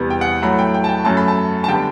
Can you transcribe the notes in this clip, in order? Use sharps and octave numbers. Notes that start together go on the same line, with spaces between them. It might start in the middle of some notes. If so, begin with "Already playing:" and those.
Already playing: E2 C3 G3 B3
G5
F#5
A2 F#3 A3 B5
G5
G5
A5
G5
F#2 F#3 A3 A5
B5
A5
A5
D3 G3 B3 G5